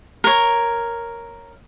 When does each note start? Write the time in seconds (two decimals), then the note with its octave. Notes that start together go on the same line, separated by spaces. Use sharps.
0.24 A#4 C#5